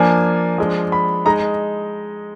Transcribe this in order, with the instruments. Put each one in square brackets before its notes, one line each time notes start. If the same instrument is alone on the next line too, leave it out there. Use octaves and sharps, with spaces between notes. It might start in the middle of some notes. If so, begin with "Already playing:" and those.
Already playing: [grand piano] F3 A#3 D4 G#5
F3 G#3 D4
B5
G#3 D#4 A#5